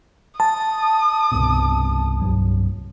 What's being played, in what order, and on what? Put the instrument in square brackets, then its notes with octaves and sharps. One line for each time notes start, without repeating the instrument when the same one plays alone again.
[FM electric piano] A5 [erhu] D#6
[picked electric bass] C2 G2 B2
C2 G2 F#3